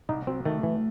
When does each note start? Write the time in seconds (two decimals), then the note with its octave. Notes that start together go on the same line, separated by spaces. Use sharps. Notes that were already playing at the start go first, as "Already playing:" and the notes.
0.09 C2 D#4
0.27 F#3 C4
0.45 D#3 A3
0.63 C2 E3